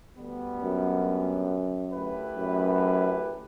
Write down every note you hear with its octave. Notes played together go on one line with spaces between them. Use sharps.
D2 D3 G3 B3
F#2
D3 A3 E4 G4 B4
F#2